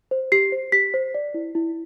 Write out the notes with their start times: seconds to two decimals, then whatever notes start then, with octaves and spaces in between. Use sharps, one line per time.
0.11 C5
0.32 G4 C7
0.52 C5
0.72 G4 B6
0.94 C5
1.14 D5
1.34 E4
1.55 E4